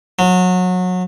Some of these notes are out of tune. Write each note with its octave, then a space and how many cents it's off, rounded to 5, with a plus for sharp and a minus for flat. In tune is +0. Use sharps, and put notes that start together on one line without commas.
F#3 -25